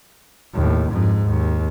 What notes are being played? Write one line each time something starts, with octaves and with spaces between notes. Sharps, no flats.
D#2 A2
F2 G#2
D#2